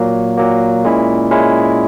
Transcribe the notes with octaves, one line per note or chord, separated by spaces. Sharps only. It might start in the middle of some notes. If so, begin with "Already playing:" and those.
Already playing: A#2 F#3 A#3
A#2 F#3 A#3
A#2 G#3 C#4 E4
A#2 G#3 C#4 E4